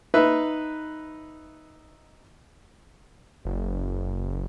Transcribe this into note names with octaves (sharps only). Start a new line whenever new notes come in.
D#4 B4 E5
F#1